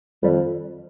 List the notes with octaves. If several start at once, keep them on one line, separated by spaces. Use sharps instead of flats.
F2 D#3 G3